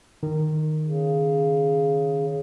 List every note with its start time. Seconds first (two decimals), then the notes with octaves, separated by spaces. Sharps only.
0.23 D#3
0.86 C#3